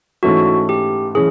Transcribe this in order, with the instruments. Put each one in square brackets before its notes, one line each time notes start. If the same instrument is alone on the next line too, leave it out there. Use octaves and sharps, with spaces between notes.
[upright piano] G#2 E3 A3 C#4 [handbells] F#4
[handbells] G4
[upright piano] E3 C#4 [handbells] G#4